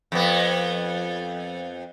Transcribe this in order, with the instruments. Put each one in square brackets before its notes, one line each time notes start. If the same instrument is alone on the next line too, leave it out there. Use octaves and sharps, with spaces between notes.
[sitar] F2 B3